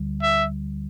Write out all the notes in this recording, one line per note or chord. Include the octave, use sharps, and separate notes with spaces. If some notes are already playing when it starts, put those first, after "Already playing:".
Already playing: D2 D3 G3
E5